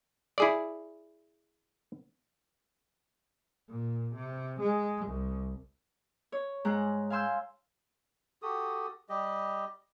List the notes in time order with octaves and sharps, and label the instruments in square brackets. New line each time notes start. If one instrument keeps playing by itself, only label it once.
[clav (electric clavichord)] E4 G#4 D5
[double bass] A#2
C3
G#3
C2
[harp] C#5
G#2 G#3 A#5 F#6
F5 G#5 C6 E6 G6
[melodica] F#4 G4 A4 D#6
G3 G4 D#5